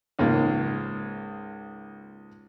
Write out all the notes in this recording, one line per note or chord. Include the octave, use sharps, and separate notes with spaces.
C#2 G#2 G#3 A#3